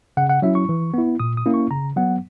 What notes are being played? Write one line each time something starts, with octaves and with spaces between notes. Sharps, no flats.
C#3 F#5
F#5
F#3 C#4 E4 E5
C#6
E3
B3 E4
A#2 D#6
D#6
A#3 C#4 E4
C#6
C#3 A#5
F#3 B3 F#5